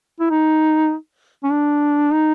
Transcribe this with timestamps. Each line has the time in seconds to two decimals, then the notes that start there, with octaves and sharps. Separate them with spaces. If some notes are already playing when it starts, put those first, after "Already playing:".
0.20 E4
0.30 D#4
1.44 C#4
1.51 D4
2.13 D#4